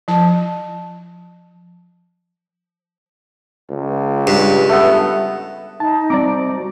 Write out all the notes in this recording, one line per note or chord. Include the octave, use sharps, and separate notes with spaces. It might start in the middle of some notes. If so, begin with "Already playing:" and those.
F3 A5
C#2
G2
A3 B3
D#4 A5
G3 C4 D5 A#5 D6
C5
F#4